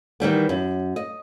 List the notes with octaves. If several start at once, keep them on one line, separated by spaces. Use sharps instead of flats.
D#3 E3 G3 B3
F#2
D#5